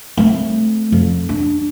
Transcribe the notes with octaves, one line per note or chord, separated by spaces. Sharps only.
A3 C4
F2
D4